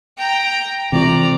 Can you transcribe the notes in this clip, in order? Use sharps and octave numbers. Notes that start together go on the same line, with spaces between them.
G5 A#5
C3 E3 F4 D5 A#5